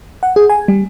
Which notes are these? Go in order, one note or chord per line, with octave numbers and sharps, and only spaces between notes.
F#5
G#4
G#5
G3